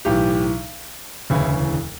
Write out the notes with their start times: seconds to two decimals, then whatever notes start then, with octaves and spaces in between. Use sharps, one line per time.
0.05 B1 A2 E3 G4
1.30 E1 D2 C#3 E3 E4